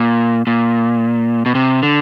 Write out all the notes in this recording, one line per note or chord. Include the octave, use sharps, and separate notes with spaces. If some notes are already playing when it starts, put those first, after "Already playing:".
Already playing: A#2
A#2
B2
C3
D3